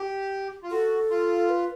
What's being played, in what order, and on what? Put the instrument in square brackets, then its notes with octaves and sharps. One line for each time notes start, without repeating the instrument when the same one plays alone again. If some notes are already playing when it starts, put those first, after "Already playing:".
Already playing: [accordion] G4
F4
[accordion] F#4 [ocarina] A4
[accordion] F4
[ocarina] B4